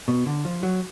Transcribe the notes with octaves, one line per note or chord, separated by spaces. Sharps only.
B2
D3
F3
F#3